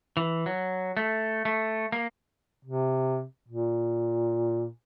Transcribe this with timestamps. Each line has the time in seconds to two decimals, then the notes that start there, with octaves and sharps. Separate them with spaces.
0.17 E3
0.46 F#3
0.97 A3
1.45 A3
1.92 A#3
2.65 C3
3.48 A#2